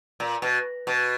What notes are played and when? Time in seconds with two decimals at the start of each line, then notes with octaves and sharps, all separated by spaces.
0.20 A#2
0.42 B2
0.87 B2